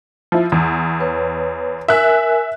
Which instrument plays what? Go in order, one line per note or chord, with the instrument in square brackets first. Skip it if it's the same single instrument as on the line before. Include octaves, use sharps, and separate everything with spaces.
[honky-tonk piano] F3 E4
E2
[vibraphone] B4 C#5
[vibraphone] A#4 G#5 [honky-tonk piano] E5 F#6